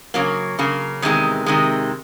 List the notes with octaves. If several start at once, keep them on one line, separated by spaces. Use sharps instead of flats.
C#3 F#3 A#3
C#3 F#3 A#3
E2 C3 D#3 G#3
C3 D#3 G#3